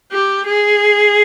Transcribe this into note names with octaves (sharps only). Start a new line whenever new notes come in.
G4
G#4